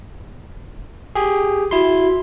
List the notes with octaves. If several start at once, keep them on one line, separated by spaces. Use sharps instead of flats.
G4 G#4
E4 F#4 C6